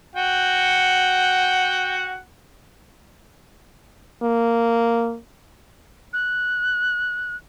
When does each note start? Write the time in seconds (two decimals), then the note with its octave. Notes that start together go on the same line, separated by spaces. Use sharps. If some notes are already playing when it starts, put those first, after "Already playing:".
0.16 F#4 F#5 G5
4.23 A#3
6.13 F#6